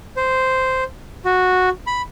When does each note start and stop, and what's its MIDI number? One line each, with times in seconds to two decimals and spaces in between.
0.16 0.84 72
1.25 1.69 66
1.87 2.02 83